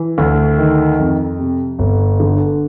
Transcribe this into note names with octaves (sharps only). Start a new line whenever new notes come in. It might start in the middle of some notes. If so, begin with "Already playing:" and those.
Already playing: E3
D2
D#3
F2
C3
G1
D3